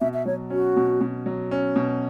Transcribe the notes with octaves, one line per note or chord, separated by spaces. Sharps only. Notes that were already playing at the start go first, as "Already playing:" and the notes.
B2 E5
E5
F#3 C#5
C#4 F#4
B2
B2
F#3
C#4
B2